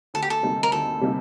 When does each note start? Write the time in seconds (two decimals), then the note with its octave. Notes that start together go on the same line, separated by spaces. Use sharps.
0.14 D2 A4
0.23 G4
0.30 A4
0.43 C3 G3 A#3 D#4
0.63 A#4
0.72 D2 A4
1.01 C3 G3 A#3 D#4